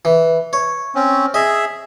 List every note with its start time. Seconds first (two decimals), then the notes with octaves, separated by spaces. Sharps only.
0.05 E3
0.53 C#5
0.95 C4 C#4
1.34 G#4 D#5 E5